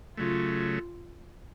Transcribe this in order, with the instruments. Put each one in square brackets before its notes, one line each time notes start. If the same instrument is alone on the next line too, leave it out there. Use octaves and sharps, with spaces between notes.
[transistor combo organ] C#3 F#3 A3 [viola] F4